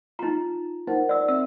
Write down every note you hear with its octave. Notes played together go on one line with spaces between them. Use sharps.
D#4 F4 A#5
D#4 A#4 C5 F#5
D5 E6
C4 E5 E6